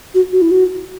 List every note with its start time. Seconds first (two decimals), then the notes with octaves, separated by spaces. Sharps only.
0.14 F#4
0.32 F#4
0.42 E4
0.51 F#4